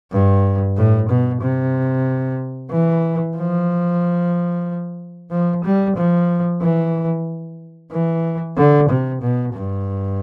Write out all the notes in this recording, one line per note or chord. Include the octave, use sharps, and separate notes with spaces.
G2
A2
B2
C3
E3
F3
F3
G3
F3
E3
E3
D3
C3
B2
G2